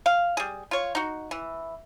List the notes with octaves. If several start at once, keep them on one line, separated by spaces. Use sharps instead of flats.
F5
G3 G#4
F4 C#5
D#4 F#4
E3